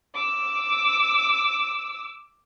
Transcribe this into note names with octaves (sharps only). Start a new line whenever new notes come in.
D6 E6